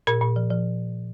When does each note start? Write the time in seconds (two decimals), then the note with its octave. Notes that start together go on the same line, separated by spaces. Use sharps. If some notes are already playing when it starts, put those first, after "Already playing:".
0.07 A#2 A#4
0.21 A#2
0.36 F3
0.50 F3